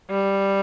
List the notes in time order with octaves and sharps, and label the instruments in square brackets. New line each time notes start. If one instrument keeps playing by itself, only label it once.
[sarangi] G3